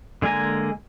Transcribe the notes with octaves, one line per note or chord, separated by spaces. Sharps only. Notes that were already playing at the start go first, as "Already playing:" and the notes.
D3 G#3 A#3 G#5 A#5